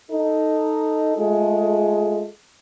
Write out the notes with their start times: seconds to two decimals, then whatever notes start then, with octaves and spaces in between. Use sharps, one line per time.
0.11 D#4 A4
1.16 G#3 A3 F4 G#4 A4